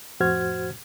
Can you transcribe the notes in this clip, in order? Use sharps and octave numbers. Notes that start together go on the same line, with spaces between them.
F2 A2 F#4 C5 F6 G#6